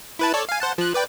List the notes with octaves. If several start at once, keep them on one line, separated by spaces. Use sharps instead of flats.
E4 B4 A5
A4 C#5 D5
F5 G#5
C5 F#5 A5
F3 F#6
B4 D5 G5